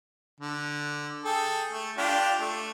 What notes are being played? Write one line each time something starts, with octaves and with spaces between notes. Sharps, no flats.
D3
G#4 A4 G5
A3
D4 F4 G4
A3